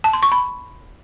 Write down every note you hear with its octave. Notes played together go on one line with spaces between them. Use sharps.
A5
C6
C#6
B5